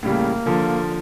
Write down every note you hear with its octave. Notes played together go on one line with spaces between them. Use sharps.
A2 C#3 G3 A#3
D3 F3 A4